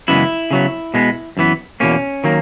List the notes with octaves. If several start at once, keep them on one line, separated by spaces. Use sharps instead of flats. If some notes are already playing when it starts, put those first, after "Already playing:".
F#2 C#3 E3 G#3 B3 E4
C#3 F#3 B3
B2 G#3 B3
F#2 E3 B3
E2 B2 A#3 C#4
D#3 F#3 A#3